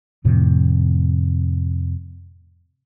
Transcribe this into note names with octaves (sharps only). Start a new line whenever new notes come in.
F2 A2 C3 F3